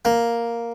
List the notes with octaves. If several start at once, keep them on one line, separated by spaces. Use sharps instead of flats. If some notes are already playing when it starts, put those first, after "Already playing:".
A#3